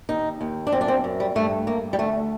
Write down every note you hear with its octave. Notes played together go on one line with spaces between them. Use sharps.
D#2 D#4
D#2
D4
F#2 C4
D4
C4
F#2
G3
G2 A3
G2 A#3
G3
D2 A3